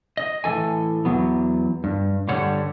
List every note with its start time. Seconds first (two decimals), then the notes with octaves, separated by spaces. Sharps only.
0.17 D#5
0.44 A2 E3 A4 G#5
1.05 E2 F#3 B3
1.84 G2
2.28 G2 D3 G3 C#5 F#5